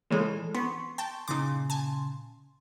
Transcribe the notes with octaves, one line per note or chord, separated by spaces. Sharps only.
A#2 C#3 E3 G#3 A4
B3 C6 C#6
G5 A5
A#2 C#3 D#4 C6 D6
G#5 A5